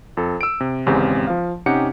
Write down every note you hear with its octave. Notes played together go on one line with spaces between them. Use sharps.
F2 A4
E6 D7
C3
G#1 E2 C#3 G#3 C4 G4
F3 F5
C3 C#4 D#4 G4 F#5 C#7